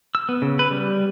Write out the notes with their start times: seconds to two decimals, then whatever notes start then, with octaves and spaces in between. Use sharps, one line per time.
0.15 E6
0.29 B3
0.42 C#3
0.59 B4
0.71 G3